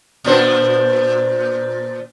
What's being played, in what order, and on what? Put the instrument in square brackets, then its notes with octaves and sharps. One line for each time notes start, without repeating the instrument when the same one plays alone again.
[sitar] A#2 D4 C5